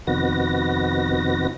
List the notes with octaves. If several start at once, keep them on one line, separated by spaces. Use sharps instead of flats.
F2 C3 D#3 B3 F#4 A#6